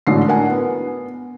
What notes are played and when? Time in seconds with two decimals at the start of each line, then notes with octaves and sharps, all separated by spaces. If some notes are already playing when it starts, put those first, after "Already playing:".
0.07 A1 G#2 D3 F#4 C7
0.27 D4 A#4 F#5 G#5
0.50 B3